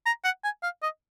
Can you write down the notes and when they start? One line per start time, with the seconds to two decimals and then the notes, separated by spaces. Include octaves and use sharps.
0.06 A#5
0.25 F#5
0.44 G#5
0.63 F5
0.83 D#5